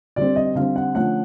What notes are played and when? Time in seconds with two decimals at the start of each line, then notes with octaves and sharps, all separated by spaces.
0.16 D3 G3 C4 D5
0.36 D#5
0.55 D3 G3 C4 F5
0.76 F#5
0.95 D3 F3 A3 C#4 F#5